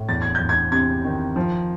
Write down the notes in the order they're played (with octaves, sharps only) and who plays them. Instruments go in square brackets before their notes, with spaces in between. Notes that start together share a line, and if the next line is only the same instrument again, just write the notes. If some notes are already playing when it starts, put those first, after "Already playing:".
Already playing: [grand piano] A2
E2 A6
G#6
G6
E2
G#6
C3 G#6
D#3
F3